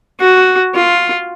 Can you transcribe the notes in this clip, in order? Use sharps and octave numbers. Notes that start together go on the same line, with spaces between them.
F#4
F4